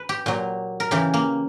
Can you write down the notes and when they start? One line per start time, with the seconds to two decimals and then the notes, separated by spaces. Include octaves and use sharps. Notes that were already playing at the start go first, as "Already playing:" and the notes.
Already playing: B4
0.09 G4
0.26 A#2 F#3
0.80 A#4
0.91 C#3 E3 G4
1.14 A#3